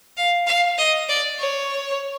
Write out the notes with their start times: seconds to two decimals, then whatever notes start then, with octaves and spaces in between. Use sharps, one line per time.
0.17 F5
0.47 F5
0.78 D#5
1.09 D5
1.39 C#5